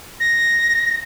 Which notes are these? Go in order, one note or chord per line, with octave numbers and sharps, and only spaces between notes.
A#6